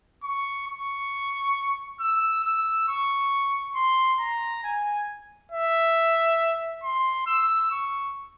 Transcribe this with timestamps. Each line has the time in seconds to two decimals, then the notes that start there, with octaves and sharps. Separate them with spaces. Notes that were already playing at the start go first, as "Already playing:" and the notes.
0.24 C#6
0.68 C#6
2.00 E6
2.44 E6
2.88 C#6
3.75 C6
4.20 A#5
4.64 G#5
5.52 E5
6.83 C6
7.27 E6
7.71 C#6